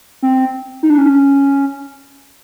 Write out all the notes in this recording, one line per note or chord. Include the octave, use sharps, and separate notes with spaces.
C4
D#4
D4
C#4